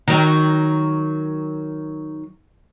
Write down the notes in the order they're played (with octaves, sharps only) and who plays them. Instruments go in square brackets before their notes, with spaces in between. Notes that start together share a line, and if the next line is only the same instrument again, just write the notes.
[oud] D#3 F#3